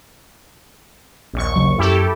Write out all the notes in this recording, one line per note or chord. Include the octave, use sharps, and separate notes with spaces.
A#1 D#2 C#6
C#3 F#3
F#2 E4 G4 A4